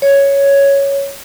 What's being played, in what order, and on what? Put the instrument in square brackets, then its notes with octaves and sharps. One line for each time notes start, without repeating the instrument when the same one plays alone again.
[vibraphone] C#5